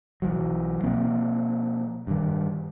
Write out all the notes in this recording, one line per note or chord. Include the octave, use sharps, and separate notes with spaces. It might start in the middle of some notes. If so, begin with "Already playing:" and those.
B1 E3 F#3
B2 F3 A#3 C4
G2 D#3